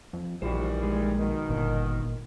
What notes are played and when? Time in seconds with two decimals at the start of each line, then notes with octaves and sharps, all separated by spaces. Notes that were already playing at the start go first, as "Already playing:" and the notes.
0.13 F2
0.42 A#1 D#3 E3 G3 F#4 C5
0.82 G#3 G#4
1.19 B2 D#3
1.49 G1 A#2